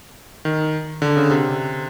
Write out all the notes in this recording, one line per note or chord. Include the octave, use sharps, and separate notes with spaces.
D#3
D3
C#3
C3